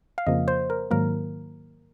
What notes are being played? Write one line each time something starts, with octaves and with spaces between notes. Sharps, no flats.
F5
F2 C#3 F3 A#3 D#5
C5
A#4
G#2 D#3 F#3 A#3 A#4